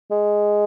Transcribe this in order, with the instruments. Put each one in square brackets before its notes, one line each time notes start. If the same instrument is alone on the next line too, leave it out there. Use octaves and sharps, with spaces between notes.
[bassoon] G#3